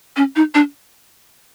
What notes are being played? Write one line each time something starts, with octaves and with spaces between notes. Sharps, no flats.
C#4
D#4
D4